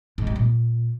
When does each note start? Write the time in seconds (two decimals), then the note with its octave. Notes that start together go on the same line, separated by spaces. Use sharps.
0.18 G#2
0.27 G3
0.36 A#2